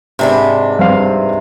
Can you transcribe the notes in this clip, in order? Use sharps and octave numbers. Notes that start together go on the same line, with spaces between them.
G#2 C3 D4 B4
G2 C4 F5